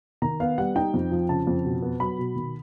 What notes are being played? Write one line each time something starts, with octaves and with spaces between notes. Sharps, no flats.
D#3 A#5
B3 F5
G3 F#5
D#4 G5
F2
F3
C#3 A5
F2
B2
B3
F#3 B5
B2
D#3